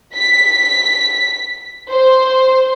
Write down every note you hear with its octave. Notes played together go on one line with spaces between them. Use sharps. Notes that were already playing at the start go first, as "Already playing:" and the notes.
B6
C5